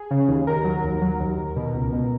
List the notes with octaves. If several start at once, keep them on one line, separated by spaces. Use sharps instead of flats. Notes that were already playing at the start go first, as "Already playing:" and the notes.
Already playing: G#4
C#3
D#2
D#2 A#4
F#3
D#2
F#3
D#2
D#2
B2
C#2
B2